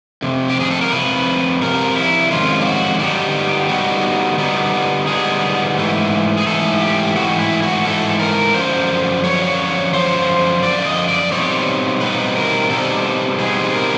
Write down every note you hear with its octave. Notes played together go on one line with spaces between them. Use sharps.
F2 C3
G4
G#4
A4
A#4
F2 C3 B4
F2 C3 A#4
E4
F2 C3 D#3 G#3 C#4 F4
G4
F#4
D3 G3 B3 D#4 G4
D3 G3 B3 D#4 F#4
D3 G3 B3 D#4
D3 G3 B3 D#4 G#4
G#2 E3 A3
G#4
G#2 E3 A3 A4
G4
G#2 E3 A3 F#4
E4
F#4
G#2 E3 A3 A4
A#4
F#2 D3 F3 C5
F#2 D3 F3 C#5
F#2 D3 F3 C5
F#2 D3 F3 D5
D#5
D5
B2 G3 C4 D#4 C#5
B2 G3 C4 D#4 B4
A#4
B2 G3 C4 D#4 A4
B2 G3 C4 D#4 G#4
A#4